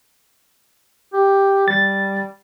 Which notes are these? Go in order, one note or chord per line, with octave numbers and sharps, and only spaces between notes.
G4
G3 A6